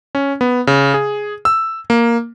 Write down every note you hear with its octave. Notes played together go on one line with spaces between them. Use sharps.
C#4
B3
C#3
G#4
E6
A#3